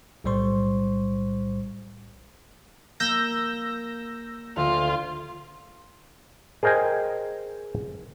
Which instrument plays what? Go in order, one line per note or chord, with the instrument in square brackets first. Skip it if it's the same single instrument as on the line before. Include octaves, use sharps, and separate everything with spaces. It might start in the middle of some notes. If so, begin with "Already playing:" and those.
[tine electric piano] B1 A2 G3 C5 C6 C#6
[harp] A#3 [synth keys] E6 G6 A#6
[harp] D2 [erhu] F4
[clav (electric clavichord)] G#4 A#4 C5 D#5 G5 G#5